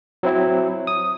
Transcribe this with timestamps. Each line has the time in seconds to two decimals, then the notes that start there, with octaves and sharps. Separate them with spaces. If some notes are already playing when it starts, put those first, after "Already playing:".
0.23 F#3 C4 E4
0.87 D#6